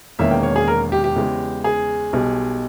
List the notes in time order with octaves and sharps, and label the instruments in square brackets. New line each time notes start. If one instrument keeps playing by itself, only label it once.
[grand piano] E1 E2 D#3 A#3 C#4 E5
G5
C#5
G#4
A#4
G4
G4
E2 C#3 G#3
G#4
B1 B2 G3